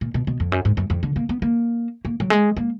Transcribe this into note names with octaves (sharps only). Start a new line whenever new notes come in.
A#2
B2
B2
F2
F#2
G#2
F#2
F2
D3
A#3
B3
A#3
A#3
F#3
G#3
A#3